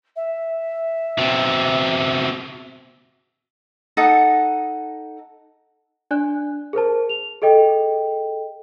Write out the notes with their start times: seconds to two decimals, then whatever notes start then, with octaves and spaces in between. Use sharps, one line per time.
0.16 E5
1.19 B2 C4
3.97 D#4 A4 F#5 D#6
6.11 D4 D5 G#5 F#6
6.73 G#4 A#4 C5 A5
7.09 F7
7.42 G#4 A4 D#5 G5